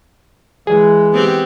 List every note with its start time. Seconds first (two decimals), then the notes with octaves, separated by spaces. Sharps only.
0.67 E3 G#3 G#4
1.12 B3 C4 G4